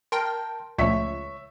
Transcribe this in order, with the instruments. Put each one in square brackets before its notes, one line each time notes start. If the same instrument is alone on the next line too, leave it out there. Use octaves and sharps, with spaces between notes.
[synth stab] A#4 G5 [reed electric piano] A5 C6
[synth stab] C#2 [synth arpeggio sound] A#2 F3 A3 [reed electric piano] C#5 C#6 [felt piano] E5 B6